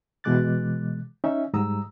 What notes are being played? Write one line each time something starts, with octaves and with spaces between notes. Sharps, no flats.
B2 E3 G#3 D6 F#6 A6
C#4 D#4 E5
G#2 G3 A#5 D#6 E6